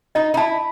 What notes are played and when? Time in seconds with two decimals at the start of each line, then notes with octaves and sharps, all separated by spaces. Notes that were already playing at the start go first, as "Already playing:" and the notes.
0.15 D#4 D#5
0.34 D#4
0.37 E4 A5